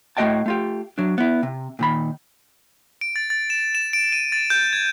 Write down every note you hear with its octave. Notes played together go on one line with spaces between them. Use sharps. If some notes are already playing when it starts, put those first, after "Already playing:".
A2 A3 F#4 D#5 G5 A5
A3 F4 G4
F#3 D4
B3 E4
C3
A#2 D#3 B5
D7
A6
A6
E7
E7
D7
D#7
A6
G6
G#6